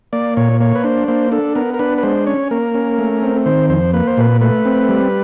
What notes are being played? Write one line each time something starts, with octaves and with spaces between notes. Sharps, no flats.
A#3 D5
A#2 C#5
A#3 C#5
B4
D4 C5
A#3 C5
D4 A4
B3 A#4
A#4
D4 B4
B4
G#3 C5
C#4 C#5
A#3 A#4
C#4
A3
C4
D#3 C5
F2 C5
A#3 B4
C5
A#2 B4
A3 B4
C4
G3